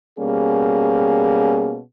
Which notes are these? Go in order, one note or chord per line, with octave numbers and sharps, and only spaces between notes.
B2 G3 A#3 C#4 G#4